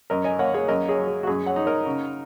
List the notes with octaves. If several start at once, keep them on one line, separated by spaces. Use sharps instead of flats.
F#2 A#4 D#5
D#5 G#5
A#3 C#5 F#5
G#4 C#5
F#2 A#4 D#5
G#4 C#5
F#3
G#4
F#4
F#2 G#4
C#5 F#5
D#4
A#4 D#5
C#3